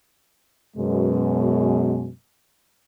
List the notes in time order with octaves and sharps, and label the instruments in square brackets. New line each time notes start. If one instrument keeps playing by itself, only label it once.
[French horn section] F#2 B2 G#3